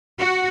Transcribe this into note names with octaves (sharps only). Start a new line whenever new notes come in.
F#4